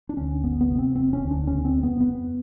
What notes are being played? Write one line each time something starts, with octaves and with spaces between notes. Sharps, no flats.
D4
D2 C#4
G1 B3
B3
C3
C4
E1 C4
C#4
D2
D4
C#3 C#4
C4
F2
B3
F2 B3